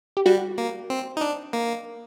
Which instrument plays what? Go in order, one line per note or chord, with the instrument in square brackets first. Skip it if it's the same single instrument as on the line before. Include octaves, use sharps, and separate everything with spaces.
[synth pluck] G4
[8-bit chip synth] G3 [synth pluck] F#4
[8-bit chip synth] A#3
C4
D#4
D4
A#3